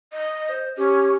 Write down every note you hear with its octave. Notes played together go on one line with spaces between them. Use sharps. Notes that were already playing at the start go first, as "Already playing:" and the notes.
D#5
C5
C#4 G4